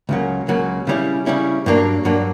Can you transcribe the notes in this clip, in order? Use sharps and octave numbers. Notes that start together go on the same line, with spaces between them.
C#2 C#3 F#3 A#3
C#2 C#3 F#3 A#3
C#3 G3 C#4 E4
C#3 G3 C#4 E4
G2 F#3 A#3 D4
G2 F#3 A#3 D4